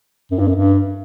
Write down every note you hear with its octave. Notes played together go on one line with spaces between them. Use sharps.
F#2
G2
F#2
G2